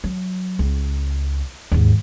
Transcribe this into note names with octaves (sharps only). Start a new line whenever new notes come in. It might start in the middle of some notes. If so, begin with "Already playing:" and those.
F#3
C#2
D#2 G#2